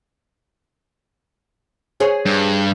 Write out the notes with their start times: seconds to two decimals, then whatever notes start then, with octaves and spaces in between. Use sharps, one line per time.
2.00 G#4 C5 C#5
2.26 G2